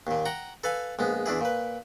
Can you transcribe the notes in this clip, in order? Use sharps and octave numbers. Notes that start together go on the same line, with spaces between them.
D#2 A#2
F#5 G5 A#5
A4 B4 F5 G#5
A#1 G#3 B3
E2 D4 E4 G#4
A#2 B4